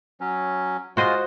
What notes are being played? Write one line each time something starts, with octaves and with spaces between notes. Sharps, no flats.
F#3 C#4
G#3 F4 F#4 C5 D#5